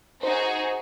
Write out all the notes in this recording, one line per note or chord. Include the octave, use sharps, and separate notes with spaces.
D#4 F#4 G#4 C5